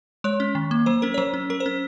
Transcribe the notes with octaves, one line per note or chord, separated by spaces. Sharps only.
G#3 C#5
C#4
D#3
A#3
F#3 C5
C#4 A#4
C#5
F#3 C5
C#4
F#3 A#4
C5
C#4